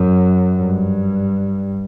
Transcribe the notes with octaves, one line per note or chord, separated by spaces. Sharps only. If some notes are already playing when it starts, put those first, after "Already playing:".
Already playing: F#2
G2